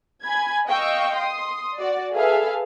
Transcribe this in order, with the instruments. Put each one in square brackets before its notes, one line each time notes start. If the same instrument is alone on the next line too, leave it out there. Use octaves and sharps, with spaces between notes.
[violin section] G#5 B5 G#6
D#5 F5 G5 C#6 E6
C6 D#6
F#4 D5
G#4 A4 B4 E5 F5